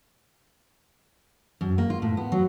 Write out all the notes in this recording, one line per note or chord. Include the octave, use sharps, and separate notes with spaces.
F#2
A#3
F4
A2
B3
F#3